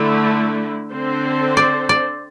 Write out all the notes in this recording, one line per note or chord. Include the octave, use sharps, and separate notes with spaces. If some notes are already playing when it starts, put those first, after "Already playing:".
Already playing: D3 A3 E4
D3 C4 A4 C5
D5
D5